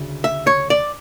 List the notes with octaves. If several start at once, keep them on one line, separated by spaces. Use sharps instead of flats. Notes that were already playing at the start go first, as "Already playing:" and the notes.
Already playing: D2 C#3
E5
C#5
D5